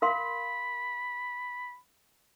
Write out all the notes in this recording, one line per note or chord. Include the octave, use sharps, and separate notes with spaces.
A#4 F5 B5 C6